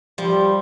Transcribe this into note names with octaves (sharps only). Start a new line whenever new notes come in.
F3 G3